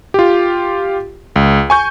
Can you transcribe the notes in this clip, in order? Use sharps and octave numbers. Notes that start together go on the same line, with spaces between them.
F4 G4
C#2
G#5 C#6 G6